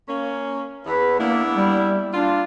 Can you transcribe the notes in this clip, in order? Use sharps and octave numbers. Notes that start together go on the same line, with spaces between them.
A#3 C#4
E2 B4
A#3 B3 D4 E4
G3
A#2 D4 F4